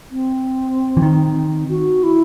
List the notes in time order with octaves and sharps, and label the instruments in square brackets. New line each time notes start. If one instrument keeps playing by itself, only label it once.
[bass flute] C4
[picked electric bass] E3
D#3
[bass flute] F#4
E4